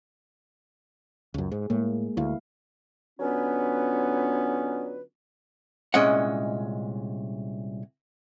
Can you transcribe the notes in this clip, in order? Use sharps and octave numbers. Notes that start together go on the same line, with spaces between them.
C#2 F#2
G#2 G#4
A2 G#3 A#3
D2 E4 F5
D3 F#3 B3 C#4 F4 B4
C2 A#2 G#3 C#4 D#5 F#5